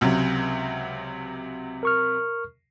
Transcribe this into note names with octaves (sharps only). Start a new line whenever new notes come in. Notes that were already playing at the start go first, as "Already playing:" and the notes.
C#2 C3 F#3
A#4 C#6 F6